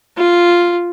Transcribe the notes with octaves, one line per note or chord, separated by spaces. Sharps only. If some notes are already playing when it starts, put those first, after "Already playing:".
F4